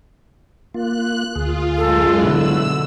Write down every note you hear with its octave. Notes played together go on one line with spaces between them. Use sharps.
A#3 F4 F#6
D2 F4 G#4
F#2 G#3 F4 A4
B2 D3 F#3 E4 E6 F#6